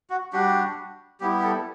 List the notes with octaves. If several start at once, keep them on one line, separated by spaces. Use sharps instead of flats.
F#4
G3 D4 F#4 G4
G3 B3 E4 G4
G4
A4